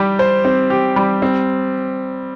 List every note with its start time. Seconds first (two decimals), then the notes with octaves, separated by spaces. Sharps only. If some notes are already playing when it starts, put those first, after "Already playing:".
Already playing: G3 G4
0.19 C5
0.45 C4
0.70 G4
0.96 G3
1.22 C4